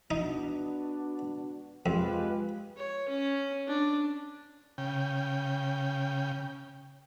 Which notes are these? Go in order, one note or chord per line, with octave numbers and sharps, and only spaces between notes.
B3 D4 D#4 F#4
F2 G#3 F4 G4 B4
C#5
C#4
D4
C#3 G5